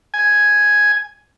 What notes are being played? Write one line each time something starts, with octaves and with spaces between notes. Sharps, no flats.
G#5